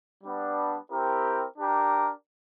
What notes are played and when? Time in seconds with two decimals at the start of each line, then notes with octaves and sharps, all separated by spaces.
0.24 G3 B3 D4
0.91 C4 E4 G4 A#4
1.58 D4 G4 A#4